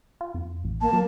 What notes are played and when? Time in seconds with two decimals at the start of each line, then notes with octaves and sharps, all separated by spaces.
0.21 F4
0.34 F2
0.64 A1
0.81 A#3 A5
0.93 F#3 A#3